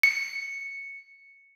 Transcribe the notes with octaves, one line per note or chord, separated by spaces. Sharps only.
C#7